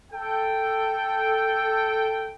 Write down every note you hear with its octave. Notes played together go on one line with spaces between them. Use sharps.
A4 G5